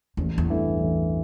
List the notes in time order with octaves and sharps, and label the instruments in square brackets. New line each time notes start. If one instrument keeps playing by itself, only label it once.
[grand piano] A1 [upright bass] E2
[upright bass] E2
[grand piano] G2 E3 A3
A1